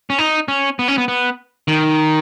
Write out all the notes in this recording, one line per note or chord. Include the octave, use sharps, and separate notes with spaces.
C#4
D#4
C#4
B3
C#4
B3
B3
D#3